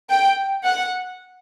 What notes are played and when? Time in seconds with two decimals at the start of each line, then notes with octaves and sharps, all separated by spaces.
0.10 G5
0.65 F#5